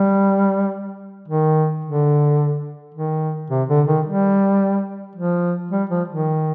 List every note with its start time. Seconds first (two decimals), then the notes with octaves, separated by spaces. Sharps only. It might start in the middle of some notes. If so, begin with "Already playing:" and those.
Already playing: G3
1.28 D#3
1.85 D3
2.94 D#3
3.50 C3
3.69 D3
3.87 D#3
4.06 G3
5.16 F3
5.71 G3
5.90 F3
6.08 D#3